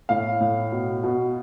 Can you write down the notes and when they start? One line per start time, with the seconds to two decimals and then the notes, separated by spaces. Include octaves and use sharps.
0.09 A2 F5
0.41 A2
0.72 B2
1.03 B2